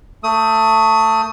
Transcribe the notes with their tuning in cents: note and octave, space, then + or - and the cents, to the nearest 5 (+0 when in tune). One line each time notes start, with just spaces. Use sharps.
A3 +20 D#6 +25